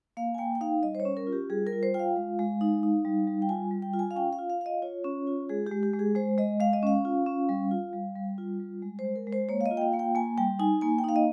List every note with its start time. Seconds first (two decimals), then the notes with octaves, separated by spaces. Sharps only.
0.17 A#3 F5
0.34 G#5
0.38 A#3 G5
0.55 G5
0.61 D#4 F5
0.82 G3 D#5
0.95 C5
1.00 C#5
1.05 C#4
1.17 A#4
1.27 F4
1.32 G4
1.50 G3 G#4
1.67 A#4
1.72 F4
1.83 C5
1.94 F4 G5
1.99 F5
2.16 G#3
2.39 G#3
2.61 D#4
2.83 D#4
3.05 G3
3.27 G3
3.42 G5
3.49 F4 G#5
3.71 G3
3.82 G5
3.93 F4
3.99 G#5
4.11 F5
4.16 C#4 G5
4.33 F5
4.39 F4
4.50 F5
4.60 F4 F5
4.66 D#5
4.82 F4 C#5
5.04 C#4
5.27 F4
5.49 G#3 G#4
5.66 G4
5.71 G#3
5.83 G4
5.93 G#3
5.99 G#4
6.15 G#3 C5
6.38 G#3 D#5
6.60 G#3 F5
6.73 D#5
6.83 C#4 F5
7.05 F4
7.26 C#4
7.49 G3
7.71 F4
7.93 G3
8.16 G3
8.38 F4
8.60 G3
8.82 G#3
8.99 C5
9.05 G#3
9.16 A#4
9.27 G#3
9.32 C5
9.49 A#3 C#5
9.61 F5
9.66 D#5
9.71 F4
9.77 G5
9.82 F5
9.93 A#3 F5
9.99 G5
10.15 A#3 G#5
10.38 G3 G5
10.59 D#4 G#5
10.81 A#3 G#5
10.98 G5
11.04 D#4 F5
11.16 D#5